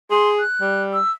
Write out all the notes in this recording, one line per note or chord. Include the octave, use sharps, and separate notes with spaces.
G#4 C6
F#6
G3
E6